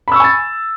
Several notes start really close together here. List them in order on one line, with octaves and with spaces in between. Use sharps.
B5 E6 C#6 G#5 A6